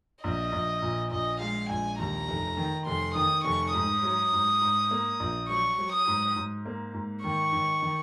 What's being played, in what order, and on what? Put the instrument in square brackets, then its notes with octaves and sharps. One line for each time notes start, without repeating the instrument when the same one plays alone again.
[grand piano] A#1 [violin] D#5
[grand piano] A#1
A#2
[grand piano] A#1 [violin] D#5
[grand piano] G#3 [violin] F5
[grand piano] A#1 [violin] G#5
[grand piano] D#2 [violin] A#5
[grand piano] F1
D#3
[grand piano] F1 [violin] C6
[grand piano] D#3 [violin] D#6
[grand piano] F1 [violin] C#6
[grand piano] G#2 [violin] D#6
[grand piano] F#3
G#2
G#2
A#3
A#1
[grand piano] F#3 [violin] C#6
[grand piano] F#3
[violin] D#6
[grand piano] G#2
G#2
A#3
G#2
[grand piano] D#3 [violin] C#6
[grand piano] D#3
D#3